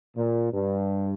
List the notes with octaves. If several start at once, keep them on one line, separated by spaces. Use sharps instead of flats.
A#2
G2